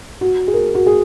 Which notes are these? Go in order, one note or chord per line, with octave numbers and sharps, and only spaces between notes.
F#4
G#4
A#4
F#4
G#4